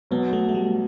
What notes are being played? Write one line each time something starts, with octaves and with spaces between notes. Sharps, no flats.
B1 B2 F#3 B3
A3
A3
G3